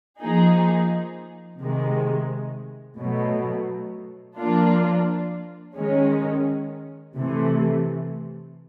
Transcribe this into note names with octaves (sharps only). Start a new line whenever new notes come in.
F3 A#3 D#4 G#4
C3 D#3 G#3
B2 F#3 A3
F3 A#3 D4 F4
D#3 G#3 C#4
C3 E3 A3